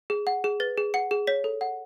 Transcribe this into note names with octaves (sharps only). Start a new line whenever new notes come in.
G#4
F#5
G#4
B4 A6
G#4
F#5 C#7
G#4
C#5 B6
A4
F#5